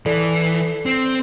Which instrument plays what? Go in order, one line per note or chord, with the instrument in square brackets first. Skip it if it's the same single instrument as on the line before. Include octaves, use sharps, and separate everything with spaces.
[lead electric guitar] E3 [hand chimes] A4 D5
[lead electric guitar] C4